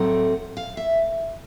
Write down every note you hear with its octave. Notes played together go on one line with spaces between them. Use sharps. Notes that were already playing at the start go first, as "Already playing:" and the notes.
Already playing: A2 F#3 A3 C4 F#5
F5
E5